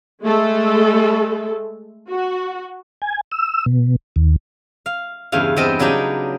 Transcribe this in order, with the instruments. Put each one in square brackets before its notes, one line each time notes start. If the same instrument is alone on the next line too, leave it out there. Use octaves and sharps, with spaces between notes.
[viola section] G#3 A3 A4
F#4
[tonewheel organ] G#5
E6
B2
D#2
[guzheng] F5
E2 G2 C#3 F5
E2 B3 C4 D#5 G5 A5
C#3 F#3 D4 D#4 G4